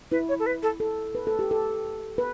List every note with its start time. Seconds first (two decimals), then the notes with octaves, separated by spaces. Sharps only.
0.11 E4 B4
0.29 C#5
0.39 A4
0.46 B4
0.63 A4
0.80 A4
1.15 B4
1.27 A4
1.39 G4
1.51 A4
2.18 B4